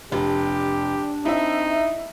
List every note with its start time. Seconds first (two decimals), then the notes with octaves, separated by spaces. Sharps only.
0.12 F1 D4 G4
1.25 C4 D#4 E4 E5